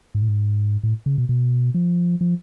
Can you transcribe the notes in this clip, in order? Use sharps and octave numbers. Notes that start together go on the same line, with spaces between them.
G#2
A2
G#2
A2
C#3
B2
B2
F3
F3